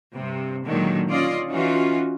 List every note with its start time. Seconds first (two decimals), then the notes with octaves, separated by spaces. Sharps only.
0.14 G2 C3
0.65 A#2 D3 D#3 F#3 G#3
1.08 C#4 F4 D5 D#5
1.50 E3 C#4 D#4 F4 F#4